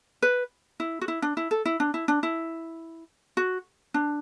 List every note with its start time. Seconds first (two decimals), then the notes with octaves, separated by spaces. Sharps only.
0.22 B4
0.80 E4
1.01 F#4
1.08 E4
1.22 D4
1.37 E4
1.51 A4
1.65 E4
1.80 D4
1.94 E4
2.08 D4
2.23 E4
3.37 F#4
3.94 D4